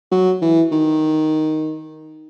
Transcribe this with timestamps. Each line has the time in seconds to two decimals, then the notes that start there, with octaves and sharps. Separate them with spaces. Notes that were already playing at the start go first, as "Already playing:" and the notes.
0.11 F#3
0.42 E3
0.72 D#3